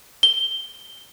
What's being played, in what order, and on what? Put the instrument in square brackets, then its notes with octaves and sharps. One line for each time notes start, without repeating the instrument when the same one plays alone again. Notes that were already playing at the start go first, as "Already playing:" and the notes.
[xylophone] G7